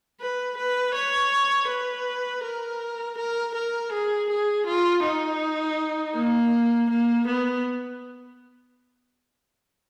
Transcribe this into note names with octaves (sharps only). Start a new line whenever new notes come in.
B4
B4
C#5
B4
A#4
A#4
A#4
G#4
G#4
F4
D#4
A#3
A#3
B3